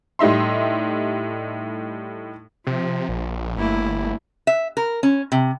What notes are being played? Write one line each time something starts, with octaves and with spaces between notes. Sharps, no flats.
A2 G3 D#4 E5 C6
C3 F3
A#1
G1 A3 A#3 E4
E5
A#4
C#4
C3